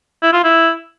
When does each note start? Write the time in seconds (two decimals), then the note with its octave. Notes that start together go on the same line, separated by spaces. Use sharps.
0.23 E4
0.33 F4
0.44 E4